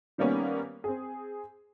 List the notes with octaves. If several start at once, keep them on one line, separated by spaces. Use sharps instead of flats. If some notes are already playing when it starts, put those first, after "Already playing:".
D#3 G3 A#3 B3 C#4
C4 G#4